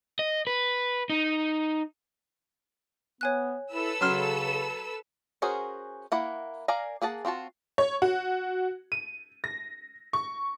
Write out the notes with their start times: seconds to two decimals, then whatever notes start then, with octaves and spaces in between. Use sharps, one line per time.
0.19 D#5
0.47 B4
1.10 D#4
3.21 B3 C#5 G#5 F#6
3.72 E4 A4 B4 E6
4.01 C#3 F#3 C6 F6
5.42 C#4 F#4 G#4 A#4 C5
6.12 A#3 E4 F#5
6.68 A#4 D5 F5 G#5 A#5
7.02 A#3 G#4 F#5 A5
7.25 C4 F4 F#4 A5
7.78 C#5
8.02 F#4
8.92 D#7
9.44 A#6
10.13 C#6